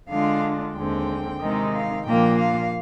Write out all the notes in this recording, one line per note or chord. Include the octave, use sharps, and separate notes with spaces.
D3 G#3 D4 F4 F5
D#2 D3 G#3 C4 G5
C3 D#3 G#3 C4 D#4
F5
A#2 F3 A#3 D4 F4 G5
F5